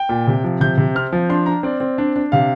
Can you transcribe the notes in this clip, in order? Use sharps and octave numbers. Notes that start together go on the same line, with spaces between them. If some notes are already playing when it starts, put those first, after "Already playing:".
Already playing: G5
A#2
C3
F3
C3 G6
C3
C4 F6
F3
D4 C6
D4 A#5
C4 D5
C4
D4
D4
C3 F5